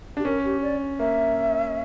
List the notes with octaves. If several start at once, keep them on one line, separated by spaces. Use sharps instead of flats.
D4 G4
C#4 A#4
G4
D5
A#3 E5